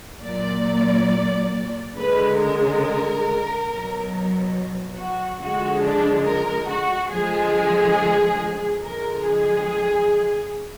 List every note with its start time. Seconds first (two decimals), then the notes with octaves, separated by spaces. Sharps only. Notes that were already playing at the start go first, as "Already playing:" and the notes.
0.23 A#2 F#3 D5
1.96 D3 G#3 B4
2.39 A#4
3.68 B2 F#3
4.97 F#4
5.40 D3 F3 G#3 F#4
5.82 D4
6.25 A#4
6.68 F#4
7.11 D3 F3 G#3 G#4
8.83 D3 F3 G#3 A#4
9.26 G#4